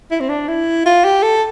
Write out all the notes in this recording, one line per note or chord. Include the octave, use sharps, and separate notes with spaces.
E4
C4
D4
E4
F4
G4
A4